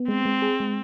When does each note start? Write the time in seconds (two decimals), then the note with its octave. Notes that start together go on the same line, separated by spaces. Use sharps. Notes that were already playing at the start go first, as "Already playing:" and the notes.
Already playing: B3
0.08 G#3 C4
0.25 G#3
0.42 G#4
0.60 G#3